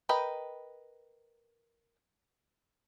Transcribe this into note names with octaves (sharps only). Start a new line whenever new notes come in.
A#4 B4 D#5 G5